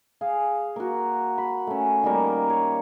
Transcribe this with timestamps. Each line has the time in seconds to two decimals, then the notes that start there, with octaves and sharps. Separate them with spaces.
0.21 G#4 F5
0.76 A#3 F#4
1.38 B5
1.67 A3 C#4
2.03 D#3 G3 A#3
2.50 C#5